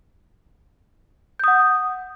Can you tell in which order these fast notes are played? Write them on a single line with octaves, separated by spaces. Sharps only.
G6 D#6 F#5